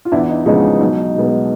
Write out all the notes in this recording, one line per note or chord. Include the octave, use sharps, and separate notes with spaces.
F4
E2 D4 E4
D#4
C#3 F3 G#3 B3 D#4
B1 D#4
B2 G#3 B3